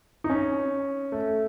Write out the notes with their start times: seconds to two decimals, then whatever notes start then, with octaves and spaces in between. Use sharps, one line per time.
0.24 D#4
0.30 C#4
1.12 A3